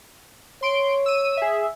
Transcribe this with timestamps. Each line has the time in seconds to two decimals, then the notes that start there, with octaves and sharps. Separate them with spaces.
0.62 C#5 C6 D7
1.06 E6 D#7
1.37 G#4 E5